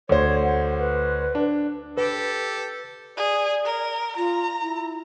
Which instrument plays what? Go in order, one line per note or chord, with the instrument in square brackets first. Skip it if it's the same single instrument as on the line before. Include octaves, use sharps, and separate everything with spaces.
[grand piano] D2 C5 [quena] C#5
[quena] F#5
B4
[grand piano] D4
[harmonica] G4 A4 [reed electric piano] B4
[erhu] G#4 [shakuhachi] D5
[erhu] A#4
[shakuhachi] F4 [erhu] A#5
[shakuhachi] E4